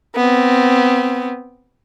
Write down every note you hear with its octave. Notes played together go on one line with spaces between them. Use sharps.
B3 C4